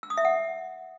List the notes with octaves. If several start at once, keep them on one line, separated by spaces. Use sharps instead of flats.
E6
D#6
E5
F#5